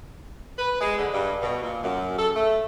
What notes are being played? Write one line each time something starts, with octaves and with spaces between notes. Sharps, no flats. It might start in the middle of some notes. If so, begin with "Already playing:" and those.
B4
G#3
D3
G2
B2
A#2
F#2
A4
A3